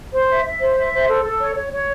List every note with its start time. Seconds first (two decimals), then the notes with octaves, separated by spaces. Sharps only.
0.13 C5
0.29 E5
0.46 E5
0.61 C5
0.78 E5
0.92 C5
1.08 A4
1.24 A4
1.40 C#5
1.56 C#5
1.72 C#5